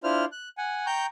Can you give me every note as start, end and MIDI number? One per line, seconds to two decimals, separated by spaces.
0.04 0.25 62
0.04 0.25 64
0.04 0.25 65
0.04 0.25 72
0.04 0.25 89
0.32 0.49 90
0.58 0.86 78
0.58 0.86 80
0.86 1.06 79
0.86 1.06 82
0.86 1.06 85
0.86 1.06 91